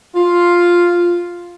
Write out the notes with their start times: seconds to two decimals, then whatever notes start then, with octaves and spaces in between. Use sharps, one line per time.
0.16 F4